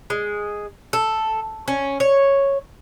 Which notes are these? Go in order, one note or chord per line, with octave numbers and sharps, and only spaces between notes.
G#3
A4
C#4
C#5